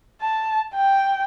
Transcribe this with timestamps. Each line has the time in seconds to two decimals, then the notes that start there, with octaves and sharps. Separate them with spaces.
0.22 A5
0.74 G5